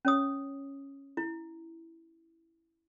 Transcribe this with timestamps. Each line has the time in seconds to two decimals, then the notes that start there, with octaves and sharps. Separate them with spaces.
0.05 C#4 C#5 D#6
1.17 E4